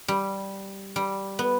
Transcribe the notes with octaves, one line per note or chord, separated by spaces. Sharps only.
G3
G3
B3